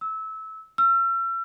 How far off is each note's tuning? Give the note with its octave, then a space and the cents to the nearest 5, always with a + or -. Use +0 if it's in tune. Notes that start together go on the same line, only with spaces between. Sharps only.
E6 -20
E6 +40